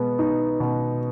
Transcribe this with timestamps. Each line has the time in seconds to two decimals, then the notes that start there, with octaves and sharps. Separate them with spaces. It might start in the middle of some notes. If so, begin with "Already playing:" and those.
Already playing: B2 G#3 B3
0.19 D#4
0.60 B2